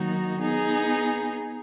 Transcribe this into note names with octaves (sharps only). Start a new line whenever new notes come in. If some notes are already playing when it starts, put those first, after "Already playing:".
Already playing: D#3 F#3 A#3 D#4 F#4
B3 D#4 G#4